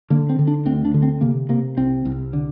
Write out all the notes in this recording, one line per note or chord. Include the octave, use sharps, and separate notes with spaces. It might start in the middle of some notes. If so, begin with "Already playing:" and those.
D3 A#3
C4
D3
D4
D2 C4
D4
D3
C4
C3 A#3
C3 A#3
C2 C4
C2
D3